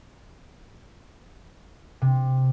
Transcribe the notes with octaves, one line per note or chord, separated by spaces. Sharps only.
C3